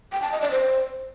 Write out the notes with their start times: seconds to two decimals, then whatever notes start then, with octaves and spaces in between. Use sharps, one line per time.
0.12 G5
0.22 A5
0.32 D#5
0.41 D5
0.51 C5